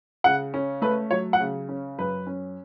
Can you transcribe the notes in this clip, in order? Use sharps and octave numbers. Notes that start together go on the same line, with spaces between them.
C#3 F#5
C#4
A3 B4
F#3 C#5
F#5
C#3
C#4
F#2 B4
C#4